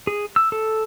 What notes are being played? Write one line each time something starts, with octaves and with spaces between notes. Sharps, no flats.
G#4
E6
A4